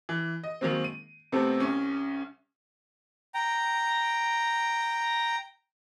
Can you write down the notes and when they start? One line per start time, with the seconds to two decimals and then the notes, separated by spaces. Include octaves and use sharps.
0.09 E3
0.44 D#5
0.61 D#3 F#3 G#3 A#3 C4
0.84 D#7
1.32 C3 A3 B3 C4
1.60 C2 C#4
3.34 G5 A#5